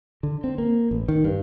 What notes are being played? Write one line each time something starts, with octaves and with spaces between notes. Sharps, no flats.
D3
C4
A#3
A1
D#3
G2